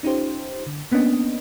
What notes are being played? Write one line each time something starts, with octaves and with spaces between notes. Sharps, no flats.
C#4 D#4 F4 G4 C5
D3
A#3 B3 C#4 D4 D#5